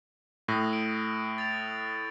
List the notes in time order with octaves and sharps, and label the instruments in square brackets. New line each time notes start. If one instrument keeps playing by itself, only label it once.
[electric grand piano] A2 [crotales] D#6 E6 A#6
[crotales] D7
A6 D7 F7